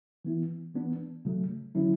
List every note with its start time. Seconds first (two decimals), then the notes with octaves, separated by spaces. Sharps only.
0.25 E3 B3 E4
0.75 E3 B3 D4
1.25 C#3 F#3 A3
1.75 D3 F#3 C#4 E4